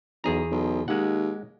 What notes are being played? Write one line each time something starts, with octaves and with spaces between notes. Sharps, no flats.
B1 E2 G#4 A#5
B1
D#2 G#3 F#5